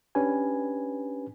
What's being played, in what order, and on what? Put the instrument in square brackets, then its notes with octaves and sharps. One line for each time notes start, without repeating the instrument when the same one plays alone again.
[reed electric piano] C#4 D4 G4 B4 G#5